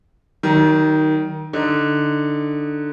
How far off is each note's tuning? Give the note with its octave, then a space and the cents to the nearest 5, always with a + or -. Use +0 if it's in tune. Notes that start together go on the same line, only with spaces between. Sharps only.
D#3 +0 F#3 +45
D3 +5 D#4 +0